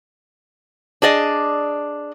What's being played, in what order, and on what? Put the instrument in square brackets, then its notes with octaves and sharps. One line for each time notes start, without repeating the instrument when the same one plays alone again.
[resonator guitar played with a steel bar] D4 G#4 D5 D#5